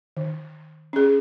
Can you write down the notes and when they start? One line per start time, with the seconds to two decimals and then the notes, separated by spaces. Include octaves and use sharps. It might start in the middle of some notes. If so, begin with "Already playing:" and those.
0.17 D#3
0.93 C#4 G#4